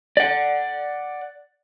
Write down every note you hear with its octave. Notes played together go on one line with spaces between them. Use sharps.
D5 F#5